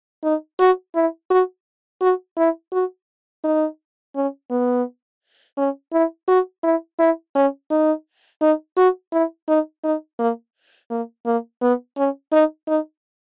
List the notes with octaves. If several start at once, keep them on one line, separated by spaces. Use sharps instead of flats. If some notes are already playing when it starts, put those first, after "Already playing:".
D#4
F#4
E4
F#4
F#4
E4
F#4
D#4
C#4
B3
C#4
E4
F#4
E4
E4
C#4
D#4
D#4
F#4
E4
D#4
D#4
A#3
A#3
A#3
B3
C#4
D#4
D#4